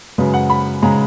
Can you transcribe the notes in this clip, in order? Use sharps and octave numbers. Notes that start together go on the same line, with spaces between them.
F#2 C#3 G#3 B4
F#5
B5
C#3 G#3 A#5